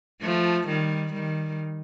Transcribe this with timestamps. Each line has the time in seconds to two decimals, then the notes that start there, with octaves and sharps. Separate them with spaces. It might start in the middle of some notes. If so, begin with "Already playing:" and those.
0.21 F3 A3
0.67 D#3 G3
1.13 D#3 G3